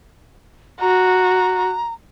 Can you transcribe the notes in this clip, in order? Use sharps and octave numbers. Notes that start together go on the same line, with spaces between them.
F#4 A#5